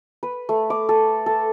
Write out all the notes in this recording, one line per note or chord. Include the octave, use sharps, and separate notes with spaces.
B4
A3
D6
A4
A4